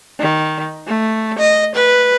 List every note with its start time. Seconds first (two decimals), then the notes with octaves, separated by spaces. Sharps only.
0.20 D#3
0.87 A3
1.39 D#5
1.75 B4